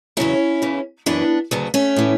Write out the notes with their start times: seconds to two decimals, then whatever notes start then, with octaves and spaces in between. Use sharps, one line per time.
0.17 E2 C#3 F#3 C#4 E4
0.62 E2 C#3 E3
1.06 F#2 E3 B3 D4
1.51 D2 C#3 F#3 B3
1.74 A3 C#4
1.96 A2 E3